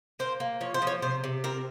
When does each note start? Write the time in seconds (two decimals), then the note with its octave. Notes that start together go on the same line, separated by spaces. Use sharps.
0.19 A#3 C5
0.40 A#3
0.61 F3 C#5
0.74 C5
0.82 F3
0.87 C#5
1.02 C3 C5
1.24 C3
1.44 C4 A#4